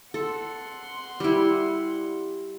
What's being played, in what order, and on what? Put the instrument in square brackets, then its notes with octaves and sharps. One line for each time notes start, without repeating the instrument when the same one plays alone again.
[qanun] A4 [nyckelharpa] F#5 C6
[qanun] G3 E4